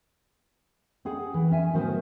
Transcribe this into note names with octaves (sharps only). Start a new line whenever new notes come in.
C4 C#4 G#4 F#5
E3
C#4 E5 G#5
A2 D#3 F#3 B3 A#4 C5